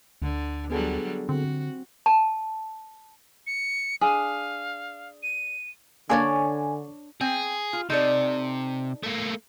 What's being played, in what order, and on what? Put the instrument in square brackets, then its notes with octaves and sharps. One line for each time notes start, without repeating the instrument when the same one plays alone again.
[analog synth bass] D2 [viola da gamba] D3
[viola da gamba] D3 F#3 G3 [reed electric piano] B3 G#4 A4
[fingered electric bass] D3 [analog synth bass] C4 [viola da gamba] F#4
[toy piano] A5
[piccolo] C#7
[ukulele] D4 G#4 [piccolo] F5
[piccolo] D#7
[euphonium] D3 [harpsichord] A#3 G#4 [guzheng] D4 C#5 D5 [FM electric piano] G#5
[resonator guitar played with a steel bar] C4 G5 [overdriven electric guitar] G#4
[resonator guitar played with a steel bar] F4
[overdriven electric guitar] C3 [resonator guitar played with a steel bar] D#4 A4 D5
[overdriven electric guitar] A3 A#3